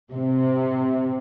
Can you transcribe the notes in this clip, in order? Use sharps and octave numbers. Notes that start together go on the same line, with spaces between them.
C3